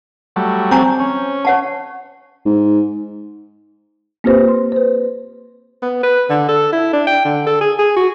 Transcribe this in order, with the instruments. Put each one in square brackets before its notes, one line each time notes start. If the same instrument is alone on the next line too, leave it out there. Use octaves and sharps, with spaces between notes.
[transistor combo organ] F#3 G3 A3
[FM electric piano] C4 [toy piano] G#5 A#5 C#6
[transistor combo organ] C#4
[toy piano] C#5 F#5 A5
[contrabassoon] G#2
[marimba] A#3 C4 F4 G4 B4 C5
C6
B4 C5
[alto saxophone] B3
B4
D3
A4
E4
D4
G5
D3
A4
G#4
G#4
F#4